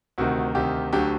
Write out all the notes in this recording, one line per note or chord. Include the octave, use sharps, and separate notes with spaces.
D2 C3 D#3 F#4
D2 C3 D#3 G4
D2 D3 F#3 G4